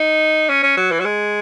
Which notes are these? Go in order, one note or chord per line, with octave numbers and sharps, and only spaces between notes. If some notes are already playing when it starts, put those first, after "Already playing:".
Already playing: D#4
C#4
C#4
F#3
E3
F#3
G#3